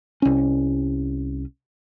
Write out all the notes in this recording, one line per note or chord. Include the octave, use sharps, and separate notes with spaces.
C2 C#4